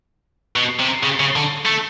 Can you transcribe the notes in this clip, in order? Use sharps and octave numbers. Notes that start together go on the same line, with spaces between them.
B2
C3
C#3
C#3
D3
A3